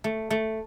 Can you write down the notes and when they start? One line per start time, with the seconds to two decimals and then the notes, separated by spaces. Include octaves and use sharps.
0.04 A3
0.30 A3